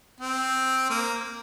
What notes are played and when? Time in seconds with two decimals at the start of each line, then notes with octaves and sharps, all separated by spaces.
0.21 C4
0.90 A#3